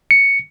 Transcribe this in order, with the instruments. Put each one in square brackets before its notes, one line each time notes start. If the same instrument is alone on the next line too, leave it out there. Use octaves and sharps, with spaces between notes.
[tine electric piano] C#7